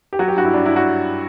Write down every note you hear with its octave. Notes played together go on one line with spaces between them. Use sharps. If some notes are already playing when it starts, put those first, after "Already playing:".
G4
F#3 F#4
G4
G2 F#4
E4
G2 D4
E4
F#4